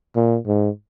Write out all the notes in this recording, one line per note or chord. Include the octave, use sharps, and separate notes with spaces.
A#2
G#2